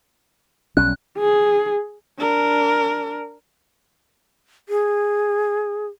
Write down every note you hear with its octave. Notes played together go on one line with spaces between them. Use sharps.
B1 G3 C#4 F#6
G#4
D4 A#4
G#4